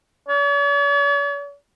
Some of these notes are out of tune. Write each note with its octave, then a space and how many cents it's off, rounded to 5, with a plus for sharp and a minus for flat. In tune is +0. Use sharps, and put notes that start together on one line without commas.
C#5 +45